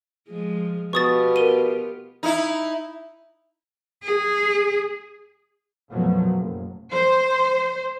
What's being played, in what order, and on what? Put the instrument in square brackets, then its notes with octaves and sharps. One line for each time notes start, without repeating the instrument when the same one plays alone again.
[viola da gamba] F3 G#3
[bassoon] B2 [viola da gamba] B3 F4 G4 [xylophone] C#6 D#6 A6
[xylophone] A#4 D#7
[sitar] D#4 E4
[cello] G#4
[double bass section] F#2 B2 F3 F#3 A3
F#1
[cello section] C5